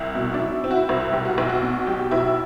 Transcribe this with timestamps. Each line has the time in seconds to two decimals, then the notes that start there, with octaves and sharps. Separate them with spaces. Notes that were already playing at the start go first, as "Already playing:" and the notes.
Already playing: C2 E4
0.15 B2
0.34 D4
0.39 F#3 E4
0.64 C4
0.71 F#4
0.76 E4
0.89 C2
1.13 B1 G4
1.25 F#4
1.38 B1 E4
1.49 F#4
1.63 B2
1.87 F#3 G4
2.11 B1 E4